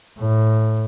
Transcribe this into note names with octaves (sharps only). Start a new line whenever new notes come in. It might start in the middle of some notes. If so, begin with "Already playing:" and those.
A2